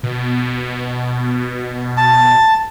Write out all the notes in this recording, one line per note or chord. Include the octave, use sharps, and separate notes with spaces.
B2
A5